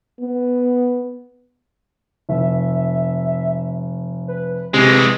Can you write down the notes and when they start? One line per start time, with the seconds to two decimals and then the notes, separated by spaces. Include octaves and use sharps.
0.20 B3
2.29 F1 E5
4.28 B4
4.74 C3 E3 G#3